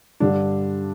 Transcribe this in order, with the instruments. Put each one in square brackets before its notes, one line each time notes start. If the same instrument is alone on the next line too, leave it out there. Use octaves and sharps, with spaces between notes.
[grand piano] G2 D3 G3 D4